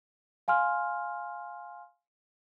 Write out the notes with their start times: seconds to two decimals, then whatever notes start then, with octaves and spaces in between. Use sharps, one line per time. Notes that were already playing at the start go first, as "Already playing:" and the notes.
0.48 F5 G#5 C6 F6